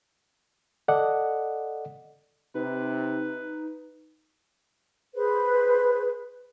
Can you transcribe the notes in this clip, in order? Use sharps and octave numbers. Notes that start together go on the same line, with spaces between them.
A4 D5 D#5 F#5
C3 D#4 B4
G#4 B4 C5